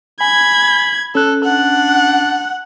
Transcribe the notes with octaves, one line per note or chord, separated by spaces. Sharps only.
G#5 B5 G#6
C#4 A4 F#6
D4 F#5